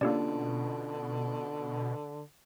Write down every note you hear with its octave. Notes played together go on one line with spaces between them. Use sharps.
B2 D3 A#3 C#4 D4 F4 G4 D5